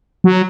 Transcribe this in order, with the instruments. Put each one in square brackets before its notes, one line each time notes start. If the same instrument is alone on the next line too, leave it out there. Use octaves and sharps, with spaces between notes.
[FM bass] F#3